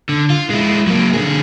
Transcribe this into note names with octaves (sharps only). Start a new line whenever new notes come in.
D3
F4
G#3 E4
F#3 A#3
D3 G#4